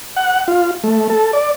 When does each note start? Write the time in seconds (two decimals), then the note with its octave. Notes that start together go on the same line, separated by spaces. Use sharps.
0.16 F#5
0.48 F4
0.84 A3
1.10 A4
1.33 D5